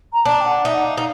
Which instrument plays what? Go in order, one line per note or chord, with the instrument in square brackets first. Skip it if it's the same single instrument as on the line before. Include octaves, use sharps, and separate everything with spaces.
[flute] A#5
[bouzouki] D4 [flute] A5
[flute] G5
F#5
[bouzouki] D#4 [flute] E5
[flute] F#5
F5
[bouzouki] D#4